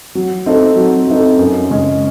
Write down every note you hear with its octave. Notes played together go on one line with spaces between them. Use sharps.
F#3
C4 D#4 A4
F#3
C4 D#4 A4
F#2
C#3 G#3 C#4